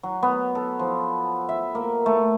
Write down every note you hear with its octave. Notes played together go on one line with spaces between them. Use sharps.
F#3
B3
A4
F3
E5
A#3
A3